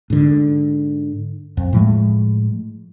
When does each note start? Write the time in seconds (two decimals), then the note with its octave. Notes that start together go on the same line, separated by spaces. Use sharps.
0.10 G#2 D3
1.57 F2
1.73 A2 F3 G#3